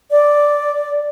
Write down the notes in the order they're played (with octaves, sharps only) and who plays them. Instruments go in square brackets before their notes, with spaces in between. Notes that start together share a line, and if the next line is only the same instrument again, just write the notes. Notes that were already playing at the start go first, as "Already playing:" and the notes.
[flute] D5